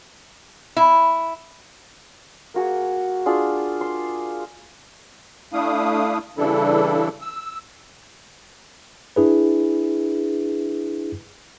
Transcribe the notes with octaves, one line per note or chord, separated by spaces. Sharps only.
E4
A#3 F#4 G#4
D4 F4 G#4
C6
A3 D4 E4 F5 D#6
C#3 E3 G3 D4 E4 A4
E6
D4 E4 G#4 B4